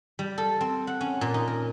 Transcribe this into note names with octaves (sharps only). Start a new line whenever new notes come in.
G3
A4
C4
F#5
C#4
A#2
D#4
A#4